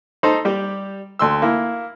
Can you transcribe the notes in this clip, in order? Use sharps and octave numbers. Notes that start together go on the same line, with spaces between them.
D#4 A4 C5
G3 G4
D2 C6 E6
A#3 E4